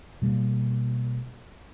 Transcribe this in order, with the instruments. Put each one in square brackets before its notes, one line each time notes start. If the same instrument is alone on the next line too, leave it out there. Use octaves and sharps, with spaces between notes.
[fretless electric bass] B2 G3 A#3